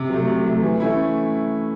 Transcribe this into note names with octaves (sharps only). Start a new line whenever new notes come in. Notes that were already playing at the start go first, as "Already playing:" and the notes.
Already playing: C3
F#3 A3
C3
F#3 A3
E3
A3 C#4 E4